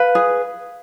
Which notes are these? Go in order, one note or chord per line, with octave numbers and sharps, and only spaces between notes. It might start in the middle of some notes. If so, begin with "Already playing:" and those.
Already playing: B4 F5
G#4